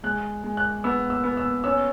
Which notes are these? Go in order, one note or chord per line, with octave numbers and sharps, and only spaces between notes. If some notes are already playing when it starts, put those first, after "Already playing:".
G#3 F#6
G#3
F#6
B3 E6
E6
B3
E6
C#4 E6